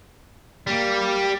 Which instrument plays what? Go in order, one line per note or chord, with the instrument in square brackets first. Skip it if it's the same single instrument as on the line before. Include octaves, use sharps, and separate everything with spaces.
[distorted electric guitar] G3 [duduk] A#3